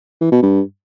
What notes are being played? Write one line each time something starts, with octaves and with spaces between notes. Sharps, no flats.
E3
B2
G2